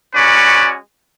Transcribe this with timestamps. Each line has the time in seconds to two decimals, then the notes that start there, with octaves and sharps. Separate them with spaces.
0.13 G#3 C#4 F#4 B4 D5